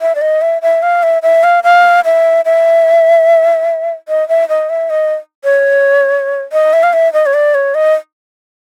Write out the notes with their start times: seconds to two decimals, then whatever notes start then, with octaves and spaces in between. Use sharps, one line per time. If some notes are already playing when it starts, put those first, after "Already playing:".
0.01 E5
0.15 D5
0.21 D#5
0.42 E5
0.62 E5
0.82 F5
1.03 E5
1.23 E5
1.43 F5
1.64 F5
2.05 E5
2.45 E5
4.08 D#5
4.29 E5
4.49 D#5
4.70 E5
4.90 D#5
5.44 C#5
6.53 D#5
6.73 E5
6.83 F5
6.93 E5
7.13 D#5
7.26 C#5
7.34 D5
7.55 C#5
7.75 D#5